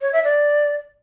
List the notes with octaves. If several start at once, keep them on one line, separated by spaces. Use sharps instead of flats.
C#5
E5
D5